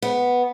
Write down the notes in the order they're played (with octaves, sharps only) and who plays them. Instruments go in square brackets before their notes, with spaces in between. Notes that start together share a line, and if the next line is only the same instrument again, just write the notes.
[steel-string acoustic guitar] B3